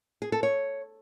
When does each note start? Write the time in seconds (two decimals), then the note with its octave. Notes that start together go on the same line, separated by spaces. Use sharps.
0.22 G#4
0.32 A4
0.43 C#5